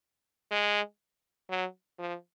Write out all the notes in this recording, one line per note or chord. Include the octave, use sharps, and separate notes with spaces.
G#3
F#3
F3